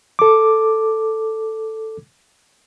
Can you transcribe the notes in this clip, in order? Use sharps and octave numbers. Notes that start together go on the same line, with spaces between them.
A4 D6